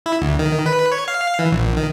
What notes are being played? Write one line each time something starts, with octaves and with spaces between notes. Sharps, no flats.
E4
D2
D#3
B4
C#5
F5
E3
A#1
D#3